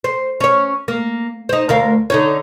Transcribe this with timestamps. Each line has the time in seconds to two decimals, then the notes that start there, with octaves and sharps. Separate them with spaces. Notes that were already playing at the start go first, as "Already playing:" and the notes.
0.04 C5
0.40 C#4 C#5
0.88 A#3
1.49 D#4 C5
1.69 D2 A#4 F5
2.10 D3 D#4 C#5